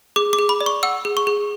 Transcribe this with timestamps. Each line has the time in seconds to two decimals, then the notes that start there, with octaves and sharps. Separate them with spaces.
0.16 G#4 D6
0.33 D6
0.39 G#4
0.49 B5
0.61 D5
0.66 C#6
0.83 F#5 E6
1.05 G#4
1.17 C#6
1.27 G#4